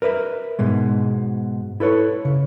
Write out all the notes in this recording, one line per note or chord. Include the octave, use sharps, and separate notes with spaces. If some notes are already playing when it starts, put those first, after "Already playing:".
A#4 B4 D5 E5
G#2 B2 G#3
E4 A4 B4 C#5
C#3